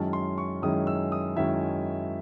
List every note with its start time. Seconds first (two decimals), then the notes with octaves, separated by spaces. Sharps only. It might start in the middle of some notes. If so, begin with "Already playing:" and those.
Already playing: F#2 D#3 G#3 C#4 E4 A5
0.13 C6
0.38 C#6
0.62 F#2 D#3 G#3 C#4 E4 D#6
0.87 E6
1.12 D#6
1.36 F#2 D#3 G#3 C#4 E4 E5